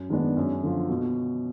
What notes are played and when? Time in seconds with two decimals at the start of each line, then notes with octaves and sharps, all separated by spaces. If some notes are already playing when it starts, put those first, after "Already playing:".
Already playing: F#2
0.09 D#3 G#3 B3 D4
0.37 F#2
0.63 D3 F3
0.89 B2